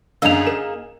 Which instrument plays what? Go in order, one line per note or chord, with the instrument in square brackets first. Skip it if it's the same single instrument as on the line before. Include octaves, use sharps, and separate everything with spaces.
[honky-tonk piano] F#2 D3 [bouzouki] A#3 D#4 G#4 [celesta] E6 F7
[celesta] A#4 [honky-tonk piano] E7